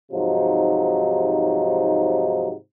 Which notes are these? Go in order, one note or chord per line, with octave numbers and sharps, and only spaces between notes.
G#2 C3 F3 F#3 D#4